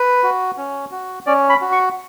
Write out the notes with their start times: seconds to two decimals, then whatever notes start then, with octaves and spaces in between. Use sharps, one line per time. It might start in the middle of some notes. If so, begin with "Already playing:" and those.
Already playing: B4
0.23 F#4
0.58 C#4
0.92 F#4
1.26 C#4 D5
1.49 B5
1.61 F#4
1.72 C#6